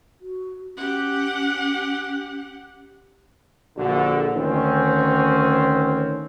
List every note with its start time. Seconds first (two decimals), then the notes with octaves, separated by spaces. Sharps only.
0.21 F#4
0.77 C#4 G4 F#5
3.76 A#1 D3 F#4
4.34 D2 D#3 C4 C#4